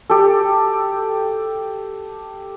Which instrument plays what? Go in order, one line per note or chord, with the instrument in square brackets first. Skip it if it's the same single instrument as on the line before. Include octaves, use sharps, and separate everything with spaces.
[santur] G4 A4